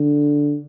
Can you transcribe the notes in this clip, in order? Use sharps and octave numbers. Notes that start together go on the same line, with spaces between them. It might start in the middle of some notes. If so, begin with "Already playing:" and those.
Already playing: D3